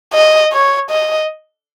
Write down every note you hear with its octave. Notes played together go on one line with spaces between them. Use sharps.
D#5
C#5
D#5